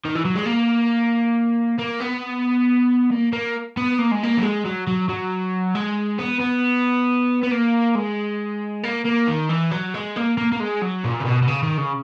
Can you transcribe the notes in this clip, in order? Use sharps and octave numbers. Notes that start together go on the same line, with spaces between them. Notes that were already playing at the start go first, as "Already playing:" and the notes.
D#3
E3
F#3
G#3
A#3
A#3
B3
A#3
A#3
B3
A#3
G#3
A#3
F#3
G#3
F#3
F#3
F#3
G#3
B3
B3
B3
A#3
G#3
A#3
A#3
D#3
E3
F#3
G#3
A#3
A#3
A#3
G#3
F#3
A#2
C#3
B2
B2
C#3
D#3
C#3